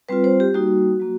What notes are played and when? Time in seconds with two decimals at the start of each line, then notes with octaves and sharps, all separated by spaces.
0.09 G3 C4 F4 B4
0.24 C5
0.40 G4
0.54 G3 A#3 D#4 F#4
1.00 F#3 A#3